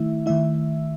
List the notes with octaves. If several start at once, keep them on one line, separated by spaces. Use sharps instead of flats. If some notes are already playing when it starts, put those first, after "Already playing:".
Already playing: D#3 A3 E4 E5
D#3 A3 E4 E5